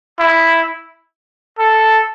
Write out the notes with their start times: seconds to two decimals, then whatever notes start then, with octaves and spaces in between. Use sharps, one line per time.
0.19 E4
1.59 A4